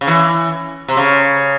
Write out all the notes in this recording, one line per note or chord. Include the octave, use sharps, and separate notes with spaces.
C#3
E3
C3
C#3